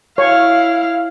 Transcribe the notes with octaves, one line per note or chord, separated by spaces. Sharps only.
E4 C#5 F5